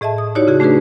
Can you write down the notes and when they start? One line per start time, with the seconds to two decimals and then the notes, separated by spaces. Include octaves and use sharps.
0.01 A2 G#4 D#5 E5 A5
0.18 D#6
0.35 D#4 E4 F#4 G4 C#5 D5
0.47 C#3 F#4 G#4
0.60 A3 D4 F#4 G#4 B4